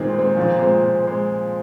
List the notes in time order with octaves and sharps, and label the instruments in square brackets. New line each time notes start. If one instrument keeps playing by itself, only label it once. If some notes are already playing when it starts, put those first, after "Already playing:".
Already playing: [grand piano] A#2 G#3 C4 [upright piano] D#3
[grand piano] G#3 C4
[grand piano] A#2 [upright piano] F3
[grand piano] G#3 C4
A#2
G#3 C4